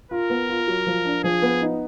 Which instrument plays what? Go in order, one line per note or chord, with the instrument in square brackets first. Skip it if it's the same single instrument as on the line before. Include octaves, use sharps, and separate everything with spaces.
[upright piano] F4 [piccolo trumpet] A#4
[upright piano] B3
F4
F#3
F3
D4
[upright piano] F3 [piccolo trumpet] G#4
[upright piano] B3
D#4